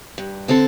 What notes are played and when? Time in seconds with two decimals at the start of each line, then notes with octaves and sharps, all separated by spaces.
0.18 G2
0.48 D3 C4 A4